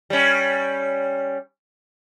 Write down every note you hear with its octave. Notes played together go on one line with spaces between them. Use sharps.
G3 C#4